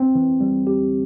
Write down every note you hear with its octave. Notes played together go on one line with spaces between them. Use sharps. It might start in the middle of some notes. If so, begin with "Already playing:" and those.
Already playing: C4
E3
G3
G4